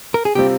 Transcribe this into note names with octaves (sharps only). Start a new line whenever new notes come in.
A#4
G#4
C3 G3 C4 F4 G4